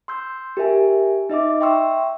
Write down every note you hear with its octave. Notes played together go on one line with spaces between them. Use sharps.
C6 E6 G6
G4 A#4 E5 G#5
D#4 D#5 E5 D6
E5 G5 C6 C#6 E6